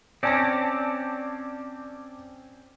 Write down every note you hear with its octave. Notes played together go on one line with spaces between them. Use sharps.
C4 C#4 D5 A5 A#6